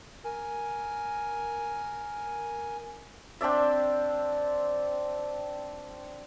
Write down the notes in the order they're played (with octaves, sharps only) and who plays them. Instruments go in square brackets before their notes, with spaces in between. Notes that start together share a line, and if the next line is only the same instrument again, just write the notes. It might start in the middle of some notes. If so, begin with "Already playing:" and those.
[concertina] A#4 G#5
[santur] C4 D4 D5 E5